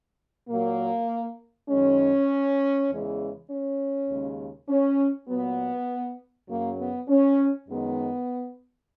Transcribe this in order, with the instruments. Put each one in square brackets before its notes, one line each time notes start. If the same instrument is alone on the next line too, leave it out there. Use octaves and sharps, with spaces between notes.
[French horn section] A#2 F#3 A#3
F#2 D#3 G#3 C#4
E2 C#3 E3 G#3
C#4
D#2 C#3 G#3
C#4
A#2 F#3 B3
F#2 C#3 F#3 A#3
B3
C#4
F#2 D#3 G#3 B3